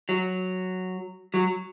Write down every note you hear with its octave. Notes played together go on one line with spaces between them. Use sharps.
F#3
F#3